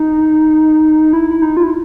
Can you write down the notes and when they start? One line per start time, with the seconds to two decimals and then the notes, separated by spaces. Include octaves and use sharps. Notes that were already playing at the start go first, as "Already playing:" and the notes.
Already playing: D#4
1.13 E4
1.30 E4
1.42 D#4
1.57 F4
1.63 E4